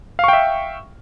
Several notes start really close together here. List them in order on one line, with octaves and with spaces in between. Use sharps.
F5 C#6 G5 E5